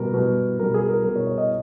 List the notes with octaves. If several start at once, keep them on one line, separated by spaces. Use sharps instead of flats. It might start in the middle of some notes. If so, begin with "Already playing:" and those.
Already playing: B2 G3 A#4
B2 G3
B2 G3 A#4
G#4
A#4
B2 G3 A#4
C#5
C#5
D#5